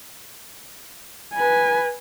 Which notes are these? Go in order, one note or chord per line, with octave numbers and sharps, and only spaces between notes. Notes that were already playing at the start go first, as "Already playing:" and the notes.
B4 G#5